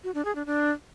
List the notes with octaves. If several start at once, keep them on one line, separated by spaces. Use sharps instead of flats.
F#4
D4
G#4
D4
D4